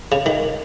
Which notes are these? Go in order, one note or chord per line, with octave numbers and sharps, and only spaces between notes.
C#3
D#3